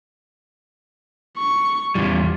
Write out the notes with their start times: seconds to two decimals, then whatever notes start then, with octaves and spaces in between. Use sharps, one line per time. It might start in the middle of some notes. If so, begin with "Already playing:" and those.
1.38 C#6
1.95 E2 G3 F4